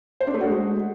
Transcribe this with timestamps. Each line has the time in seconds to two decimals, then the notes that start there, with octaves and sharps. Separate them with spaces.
0.20 C5
0.27 D4
0.34 A3
0.41 F#4
0.47 G#3